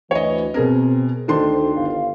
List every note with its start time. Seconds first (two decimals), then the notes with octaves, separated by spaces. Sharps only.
0.11 D2 E3 C#5 D#5
0.54 B2 C4 G#4 A#4
1.28 D2 D#3 D4 A4 C5 C6
1.75 G1 F5